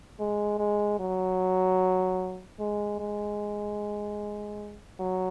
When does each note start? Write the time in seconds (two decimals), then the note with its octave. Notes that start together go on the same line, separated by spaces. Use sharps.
0.19 G#3
0.59 G#3
0.99 F#3
2.59 G#3
2.99 G#3
4.99 F#3